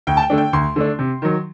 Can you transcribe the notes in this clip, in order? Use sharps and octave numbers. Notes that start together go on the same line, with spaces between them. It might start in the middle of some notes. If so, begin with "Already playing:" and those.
D2 G5
A5
G5
D3 A3 D4
G5
D2 C6
D3 A3 D4
C3
D#3 F#3